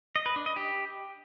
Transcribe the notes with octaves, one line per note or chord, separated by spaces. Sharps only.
D#5
B4
D4
D#5
G4